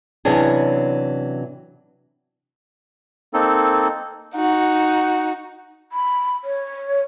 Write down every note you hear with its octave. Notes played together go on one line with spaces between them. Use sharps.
C3 E3 F#3 C#4 D4 G#4
A#3 C4 D#4 A4
D#4 F#4
B5
C#5